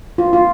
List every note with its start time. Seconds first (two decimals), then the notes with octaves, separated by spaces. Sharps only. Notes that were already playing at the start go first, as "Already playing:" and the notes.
0.18 F4
0.33 F4